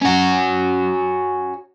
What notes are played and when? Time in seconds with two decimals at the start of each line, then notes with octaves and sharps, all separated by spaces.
0.02 C#4 F#4